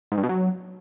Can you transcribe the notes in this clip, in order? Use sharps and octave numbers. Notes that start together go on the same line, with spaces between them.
G#2
G2
B2
F#3